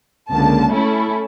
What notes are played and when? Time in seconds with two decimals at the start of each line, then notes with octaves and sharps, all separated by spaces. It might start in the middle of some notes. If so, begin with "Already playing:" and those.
0.31 C#2 D3 A#3 A5
0.71 A3 C#4 E4 A4